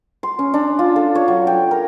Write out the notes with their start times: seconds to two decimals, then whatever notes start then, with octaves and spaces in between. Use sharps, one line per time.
0.23 C6
0.39 C#4
0.54 D4
0.79 F4
0.96 A4
1.15 C#5
1.28 F#3
1.47 G5
1.71 A#4